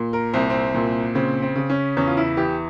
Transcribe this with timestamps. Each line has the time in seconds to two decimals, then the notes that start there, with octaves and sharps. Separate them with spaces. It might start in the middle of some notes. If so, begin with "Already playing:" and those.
Already playing: A#2
0.13 A#4
0.33 C2 C4
0.50 C4
0.74 A#2
1.15 C#3 C4
1.42 C4
1.56 C#3
1.70 C#4
1.97 E2 C#4
2.07 F4
2.17 E4
2.37 E3 G4